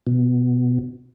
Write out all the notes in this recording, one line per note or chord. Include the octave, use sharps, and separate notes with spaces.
B2